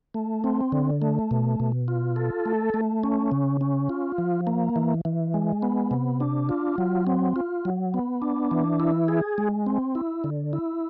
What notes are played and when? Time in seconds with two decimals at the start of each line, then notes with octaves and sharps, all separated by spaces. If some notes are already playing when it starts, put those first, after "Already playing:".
0.14 A3
0.44 C4
0.72 D3
1.02 A3
1.31 B2
1.60 B2
1.88 F4
2.16 A4
2.46 A3
2.74 A3
3.03 C#4
3.32 C#3
3.61 C#4
3.90 F4
4.18 F3
4.47 A#3
4.76 E3
5.05 E3
5.34 G#3
5.63 B3
5.91 C3
6.20 D4
6.49 F4
6.78 F#3
7.07 C4
7.36 F4
7.65 F#3
7.94 B3
8.22 D4
8.51 E3
8.80 E4
9.08 G#4
9.38 G#3
9.67 C4
9.95 E4
10.24 D3
10.53 E4